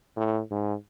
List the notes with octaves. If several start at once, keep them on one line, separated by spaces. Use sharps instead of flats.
A2
G#2